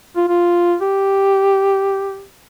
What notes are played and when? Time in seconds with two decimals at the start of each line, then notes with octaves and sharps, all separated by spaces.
0.16 F4
0.28 F4
0.81 G4